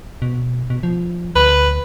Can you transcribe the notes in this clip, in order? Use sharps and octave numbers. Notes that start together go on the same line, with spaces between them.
B2
B2
F3
D2 B4